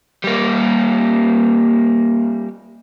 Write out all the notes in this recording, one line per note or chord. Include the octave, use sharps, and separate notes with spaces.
G3 A#3